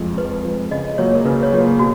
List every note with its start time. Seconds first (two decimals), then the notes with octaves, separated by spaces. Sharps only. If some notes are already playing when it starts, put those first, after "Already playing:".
Already playing: F2 F3 G#3
0.18 F2 B4
0.45 F3 G#3
0.71 C#3 D#5
0.98 F#3 A#3 F4 G#4 C#5
1.15 A#4
1.25 C#3 B4
1.43 C#5
1.52 F#3 A#3 F4 G#4
1.79 B2 F#4